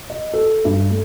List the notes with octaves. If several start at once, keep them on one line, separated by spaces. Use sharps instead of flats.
D#5
A4
G2
A3